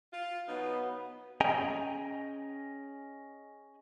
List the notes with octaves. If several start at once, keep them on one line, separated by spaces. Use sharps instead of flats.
F4
B2 F#3 B3 D#4
C#4 G#4 D#5 G5 G#5 A#5